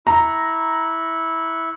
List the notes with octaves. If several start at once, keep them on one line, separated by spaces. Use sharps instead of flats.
E4 A#5 C#6 F#6